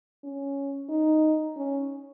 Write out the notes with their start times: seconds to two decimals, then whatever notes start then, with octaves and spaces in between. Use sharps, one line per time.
0.24 C#4
0.89 D#4
1.57 C#4